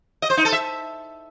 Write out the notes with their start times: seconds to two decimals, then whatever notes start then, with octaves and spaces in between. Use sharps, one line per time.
0.22 D#5
0.30 C5
0.37 D#4
0.45 A4
0.52 E5